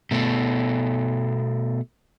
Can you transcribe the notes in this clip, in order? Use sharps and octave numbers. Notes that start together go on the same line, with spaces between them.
B2 A3